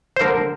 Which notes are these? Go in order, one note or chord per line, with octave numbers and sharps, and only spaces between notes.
C5
D3 A#4